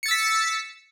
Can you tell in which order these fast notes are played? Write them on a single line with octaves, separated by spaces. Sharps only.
C#7 A6 E6 B6